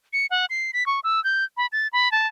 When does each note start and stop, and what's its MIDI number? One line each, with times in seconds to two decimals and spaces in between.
0.13 0.26 97
0.31 0.45 78
0.50 0.71 96
0.73 0.86 95
0.86 1.00 85
1.04 1.23 88
1.24 1.44 91
1.57 1.66 83
1.72 1.88 93
1.93 2.11 83
2.12 2.27 81